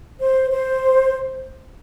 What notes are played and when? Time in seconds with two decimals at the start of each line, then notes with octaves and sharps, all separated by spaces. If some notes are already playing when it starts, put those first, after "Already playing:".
0.20 C5
0.51 C5